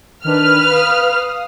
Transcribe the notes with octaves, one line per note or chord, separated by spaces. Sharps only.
D#3 D4 B4 F6
F5 D#6